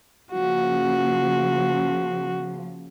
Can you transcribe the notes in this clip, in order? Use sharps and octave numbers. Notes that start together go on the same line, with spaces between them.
C#3 F3 A#3 F#4